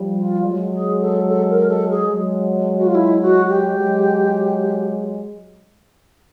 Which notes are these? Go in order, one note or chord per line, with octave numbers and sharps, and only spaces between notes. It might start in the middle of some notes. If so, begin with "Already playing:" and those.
Already playing: F3 G3
F4
F#3 G#3
G#4
A4
A4
A#4
A4
G#4
F#3 G#3
F#4
F4
E4
F#4
G4
F#3 G#3